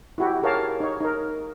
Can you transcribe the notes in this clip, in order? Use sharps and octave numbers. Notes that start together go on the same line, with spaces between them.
E4 F#4 G4
G4 G#4 A#4 C#5 F5 A5
D#4 C#5
D#4 A#4